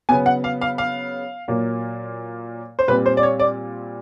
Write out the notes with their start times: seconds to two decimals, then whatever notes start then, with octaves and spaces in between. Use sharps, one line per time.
0.09 C#3 F#3 B3 G#5
0.26 F#5
0.44 F5
0.61 F5
0.78 F5
1.48 A#2 F#3 A#3
2.79 C5
2.88 A#2 G3 C4 B4
3.06 C5
3.17 D5
3.23 C#5
3.40 D5